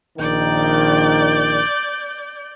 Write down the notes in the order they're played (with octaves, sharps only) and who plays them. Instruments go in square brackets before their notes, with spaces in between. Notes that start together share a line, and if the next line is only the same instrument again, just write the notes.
[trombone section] A#1 D#3 [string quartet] D5 G6